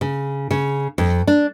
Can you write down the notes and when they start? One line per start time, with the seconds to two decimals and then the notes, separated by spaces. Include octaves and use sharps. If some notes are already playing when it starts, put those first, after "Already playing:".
0.01 C#3
0.51 C#3
0.98 F2
1.27 D4